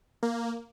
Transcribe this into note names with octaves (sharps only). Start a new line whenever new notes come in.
A#3